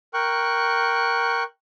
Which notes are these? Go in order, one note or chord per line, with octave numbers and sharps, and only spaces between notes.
A#4 G5 C#6 F#6